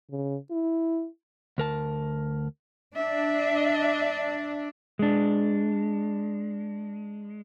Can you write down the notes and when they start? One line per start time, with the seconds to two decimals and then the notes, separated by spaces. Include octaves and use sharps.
0.11 C#3
0.51 E4
1.58 D2 A#4 A5
2.95 D4 E5
4.99 G#3 D4